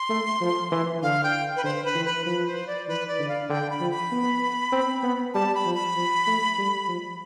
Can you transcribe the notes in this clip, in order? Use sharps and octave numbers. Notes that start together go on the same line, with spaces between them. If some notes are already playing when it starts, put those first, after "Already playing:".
Already playing: C6
A3
F3
E3
D3 F5
G5
B4
D3 C5
B4
E3
B4
F3 B4
C5
D5
E3 B4
D5
D3
F5
D3 G5
B5
F3
B5
B3
C4
B3
G3 A5
B5
F3
B5
F3
A3
G3
F3